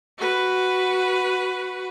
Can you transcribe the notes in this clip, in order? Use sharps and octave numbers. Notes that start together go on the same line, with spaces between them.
F#4 B4